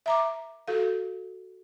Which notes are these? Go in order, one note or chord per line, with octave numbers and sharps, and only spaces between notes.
E5 A#5 D6
F#4 A4 F5